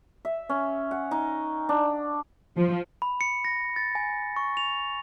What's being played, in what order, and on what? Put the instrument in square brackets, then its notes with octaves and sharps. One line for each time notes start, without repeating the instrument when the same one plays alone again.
[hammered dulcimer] E5
C#4
F#5
D#4
D4
[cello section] F3
[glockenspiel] B5
C#7
A#6
A6
G#5
C#6
F7